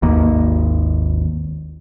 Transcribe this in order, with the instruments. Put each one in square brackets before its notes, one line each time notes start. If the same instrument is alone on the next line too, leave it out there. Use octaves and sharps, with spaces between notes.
[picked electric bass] G#1 D#2 D#3 A#3